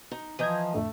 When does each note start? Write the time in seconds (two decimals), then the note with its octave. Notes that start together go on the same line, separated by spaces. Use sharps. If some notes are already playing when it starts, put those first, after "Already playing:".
0.11 D#4
0.39 E3 F3 D#5 A#5 D#6 G6 G#6
0.74 F2 A2 D3 A3